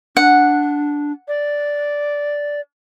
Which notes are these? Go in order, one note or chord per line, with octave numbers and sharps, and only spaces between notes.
D4 F#5
D5